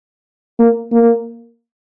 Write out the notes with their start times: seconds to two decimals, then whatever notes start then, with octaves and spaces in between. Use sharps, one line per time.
0.59 A#3
0.92 A#3